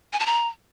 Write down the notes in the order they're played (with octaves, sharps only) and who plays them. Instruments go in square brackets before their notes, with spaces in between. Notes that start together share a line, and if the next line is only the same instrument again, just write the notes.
[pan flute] G#5
A5
A#5